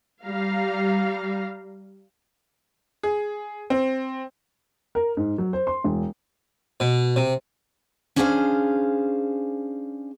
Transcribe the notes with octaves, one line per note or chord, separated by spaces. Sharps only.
G3 F5 A#5
G#4
C4
A#4
G#2
F#3
C5
C6
E1
B2
C3
C#4 D4 G#4 C5 D#5 F5